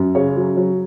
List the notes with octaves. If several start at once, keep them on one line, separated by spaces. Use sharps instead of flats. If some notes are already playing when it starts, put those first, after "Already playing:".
Already playing: F#2
C#3 C#5
F#3
F#3